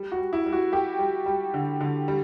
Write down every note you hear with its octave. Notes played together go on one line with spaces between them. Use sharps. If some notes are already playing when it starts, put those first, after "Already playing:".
Already playing: G3
F#4
G3
E4
G3
F#4
G3 G4
G3
G3
D3
D3
G3